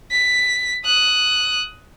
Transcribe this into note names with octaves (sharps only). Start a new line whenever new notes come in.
B6
D#6 F#6